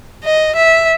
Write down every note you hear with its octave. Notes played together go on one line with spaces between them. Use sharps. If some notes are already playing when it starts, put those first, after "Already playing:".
D#5
E5